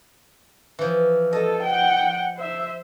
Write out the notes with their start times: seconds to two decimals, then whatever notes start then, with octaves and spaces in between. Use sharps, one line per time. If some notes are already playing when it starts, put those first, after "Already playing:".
0.79 E3 F3
1.33 A4 D#5
1.63 F#5 G5
2.36 C5 E5